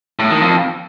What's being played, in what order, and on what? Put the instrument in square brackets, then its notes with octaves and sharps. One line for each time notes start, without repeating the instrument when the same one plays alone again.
[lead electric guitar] A2
D#3
F2